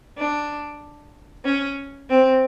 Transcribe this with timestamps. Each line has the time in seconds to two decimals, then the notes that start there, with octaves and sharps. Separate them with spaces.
0.16 D4
1.45 C#4
2.08 C4